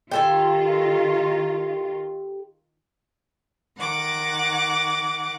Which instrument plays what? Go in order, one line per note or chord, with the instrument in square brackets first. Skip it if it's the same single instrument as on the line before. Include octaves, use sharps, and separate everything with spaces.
[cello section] D#3 F4 [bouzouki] G4 A4 G#5
[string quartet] D#3 F#5 D6